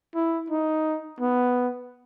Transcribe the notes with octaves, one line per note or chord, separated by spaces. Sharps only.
E4
D#4
B3